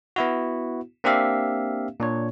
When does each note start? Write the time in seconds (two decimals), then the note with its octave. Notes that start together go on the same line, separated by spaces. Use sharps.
0.16 B3 E4 F#4
1.04 A#3 C4 D4 G4 E5 F5
2.00 A#2 D4 C#5